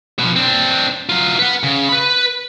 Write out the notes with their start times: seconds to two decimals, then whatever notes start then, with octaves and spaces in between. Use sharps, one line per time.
0.19 B2 F3
0.36 C4 D4
1.09 F#3 F4
1.39 B4 F#5
1.64 C#3
1.89 B4 B5